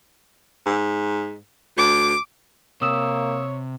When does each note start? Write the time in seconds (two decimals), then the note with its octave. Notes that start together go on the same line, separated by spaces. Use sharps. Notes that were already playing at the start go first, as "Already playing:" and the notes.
0.66 G#2
1.77 D2 D6
2.82 C3 A#3 C#5 D#6 E6 E7